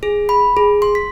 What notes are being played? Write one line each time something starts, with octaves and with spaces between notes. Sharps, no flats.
G#4
B5
G#4
C6
B6